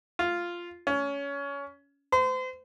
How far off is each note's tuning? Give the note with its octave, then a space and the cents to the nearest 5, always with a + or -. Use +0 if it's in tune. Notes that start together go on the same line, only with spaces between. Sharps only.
F4 -5
C#4 +20
C5 -35